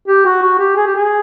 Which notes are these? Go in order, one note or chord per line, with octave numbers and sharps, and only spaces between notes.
G4
F#4
F#4
G4
G#4
G4
G#4